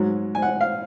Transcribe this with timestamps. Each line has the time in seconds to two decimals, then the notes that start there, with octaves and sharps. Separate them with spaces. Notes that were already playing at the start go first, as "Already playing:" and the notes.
Already playing: G#2 F#3
0.35 G#5
0.42 F#5
0.61 F5